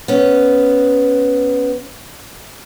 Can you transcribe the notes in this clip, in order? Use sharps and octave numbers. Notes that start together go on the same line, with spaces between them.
B3 C#4